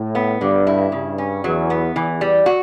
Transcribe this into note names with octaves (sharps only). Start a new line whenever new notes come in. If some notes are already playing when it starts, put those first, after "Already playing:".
Already playing: A2
B3
G2 D3
E4
G2 C#3
C#4
E2 F#3
B3
E2 E3
G3
F#4